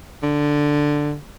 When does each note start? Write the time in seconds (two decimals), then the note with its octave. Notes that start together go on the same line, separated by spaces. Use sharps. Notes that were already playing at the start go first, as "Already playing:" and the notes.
0.23 D3